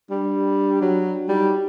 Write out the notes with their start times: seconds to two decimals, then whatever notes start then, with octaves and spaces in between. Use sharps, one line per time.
0.11 G3 D4
0.82 F#3
1.29 G3 D#4